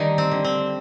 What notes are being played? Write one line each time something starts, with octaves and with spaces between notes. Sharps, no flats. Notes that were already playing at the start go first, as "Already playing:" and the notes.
Already playing: D3 D#3 G3 A3 D#4 G4
C4
D3
C4